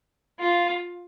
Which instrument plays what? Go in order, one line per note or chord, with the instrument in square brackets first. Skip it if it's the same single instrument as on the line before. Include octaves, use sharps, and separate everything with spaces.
[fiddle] F4